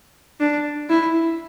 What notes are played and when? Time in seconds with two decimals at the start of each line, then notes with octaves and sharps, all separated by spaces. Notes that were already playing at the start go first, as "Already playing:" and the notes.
0.40 D4
0.89 E4